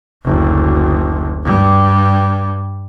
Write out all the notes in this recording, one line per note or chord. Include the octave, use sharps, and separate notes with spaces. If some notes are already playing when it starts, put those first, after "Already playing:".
F#1 D2
G2 G3